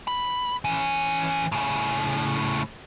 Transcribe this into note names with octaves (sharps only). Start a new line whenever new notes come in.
B5
E3 C#4
A2 C#3